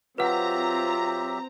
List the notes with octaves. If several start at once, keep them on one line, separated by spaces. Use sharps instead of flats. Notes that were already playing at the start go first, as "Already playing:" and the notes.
F#3 C4 F4 G4 B4 E5 F#5 A#5